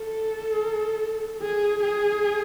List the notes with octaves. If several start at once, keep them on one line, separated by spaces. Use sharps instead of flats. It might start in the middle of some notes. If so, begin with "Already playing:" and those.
Already playing: A4
G#4
G#4